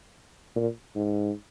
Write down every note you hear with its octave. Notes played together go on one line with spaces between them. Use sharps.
A#2
G#2